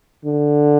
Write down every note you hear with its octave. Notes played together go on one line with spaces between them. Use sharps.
D3